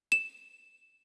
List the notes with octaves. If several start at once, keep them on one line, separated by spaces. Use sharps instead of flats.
E7